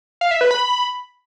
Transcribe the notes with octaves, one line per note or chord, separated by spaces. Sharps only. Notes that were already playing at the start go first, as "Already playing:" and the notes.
F5
E5
B4
B5